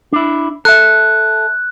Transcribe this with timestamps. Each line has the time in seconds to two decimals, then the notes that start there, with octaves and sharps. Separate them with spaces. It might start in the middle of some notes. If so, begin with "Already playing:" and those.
0.13 D4 E4
0.65 A4 E5 F#6